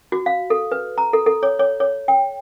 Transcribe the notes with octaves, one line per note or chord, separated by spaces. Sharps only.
F#4
F5
A4
B4
A#5
A4
A4
C#5
C#5
C#5
G5